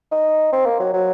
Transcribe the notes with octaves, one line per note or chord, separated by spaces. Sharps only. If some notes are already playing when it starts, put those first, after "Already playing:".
D#4
C4
A#3
F#3
F#3